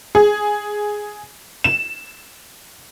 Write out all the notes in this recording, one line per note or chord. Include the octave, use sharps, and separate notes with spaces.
G#4
E7